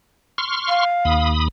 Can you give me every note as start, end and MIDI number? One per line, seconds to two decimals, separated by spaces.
0.38 0.85 84
0.38 0.85 85
0.38 0.85 89
0.68 1.28 77
1.05 1.48 39
1.05 1.48 83
1.05 1.48 87